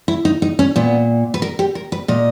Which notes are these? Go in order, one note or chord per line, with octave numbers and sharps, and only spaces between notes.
E4
D#4
D#4
C#4
A#2 B3
B4
A#4
G4
A#4
B4
A#2 D#5